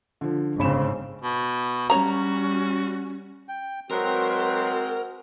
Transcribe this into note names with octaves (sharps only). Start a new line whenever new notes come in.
D3 F3
G1 G#2 C#3 C4 B5 E7
B2
G3 C#4 F#4 C#5 A#5
G5
F#3 G#3 C4 F#4 A#4 B4 C6